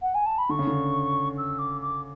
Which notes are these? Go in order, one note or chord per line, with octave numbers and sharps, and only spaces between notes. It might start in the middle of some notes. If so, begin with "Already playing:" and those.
F#5
G#5
A5
B5
D3 C#6
C#3
D3
E6
D6
D6